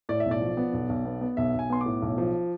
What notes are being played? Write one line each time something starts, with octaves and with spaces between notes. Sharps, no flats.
A2 D5
E5
B1
D5
F3
B3
B1
B1
B3
B3
B1 E5
B1 G#5
B3 C6
A2 D6
B1
F3